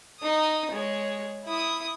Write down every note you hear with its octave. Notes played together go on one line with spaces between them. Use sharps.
D#4 D#6
G#3 C#5
E4 D#6